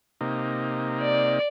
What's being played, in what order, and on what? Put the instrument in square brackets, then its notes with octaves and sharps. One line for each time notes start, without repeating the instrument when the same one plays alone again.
[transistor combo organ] C3 A#3 D#4
[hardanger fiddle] D5